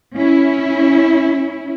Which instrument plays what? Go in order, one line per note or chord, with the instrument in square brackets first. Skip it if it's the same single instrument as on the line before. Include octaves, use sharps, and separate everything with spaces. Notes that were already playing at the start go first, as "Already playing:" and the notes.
[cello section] C#4 E4